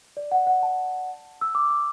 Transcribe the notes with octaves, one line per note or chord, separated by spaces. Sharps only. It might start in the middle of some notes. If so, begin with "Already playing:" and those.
D5
F#5
F#5
A5
E6
D6
D6